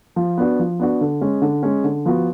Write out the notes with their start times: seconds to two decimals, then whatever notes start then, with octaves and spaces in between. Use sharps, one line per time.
0.16 F3
0.38 B3 D4 F#4
0.59 F3
0.80 B3 D4 F#4
1.01 D3
1.21 G#3 C#4
1.42 D3
1.63 G#3 C#4
1.84 D3
2.05 F3 B3 F#4